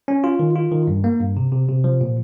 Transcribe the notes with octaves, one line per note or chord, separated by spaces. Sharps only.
C#4
F4
D#3
F4
D#3
G2
A#3
G2
C3
C3
C3
F3
A#2